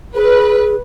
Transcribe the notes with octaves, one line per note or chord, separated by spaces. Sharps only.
G#4 B4